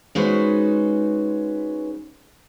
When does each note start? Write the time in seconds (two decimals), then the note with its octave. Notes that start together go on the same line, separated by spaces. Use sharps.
0.15 G#3 C#4 D#4 F#4 B4 C5